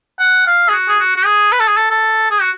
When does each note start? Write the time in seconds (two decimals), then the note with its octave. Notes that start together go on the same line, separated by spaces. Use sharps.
0.19 F#5
0.47 F5
0.69 G#4
0.72 F#4
0.88 G#4
0.99 F#4
1.16 F#4
1.25 G#4
1.52 B4
1.60 A4
1.68 G#4
1.77 A4
1.91 A4
2.31 G#4
2.42 F#4